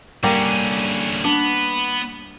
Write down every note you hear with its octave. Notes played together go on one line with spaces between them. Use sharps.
D3 G3 A#3 C#4 G4
B3 D4